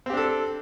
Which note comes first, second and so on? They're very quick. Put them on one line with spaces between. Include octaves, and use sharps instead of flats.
C4 G4 D4 A4